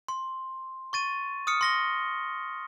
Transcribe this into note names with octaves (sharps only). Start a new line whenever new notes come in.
C6
C#6 A6 D#7
D#6 F6 C#7
C6 A#6 G7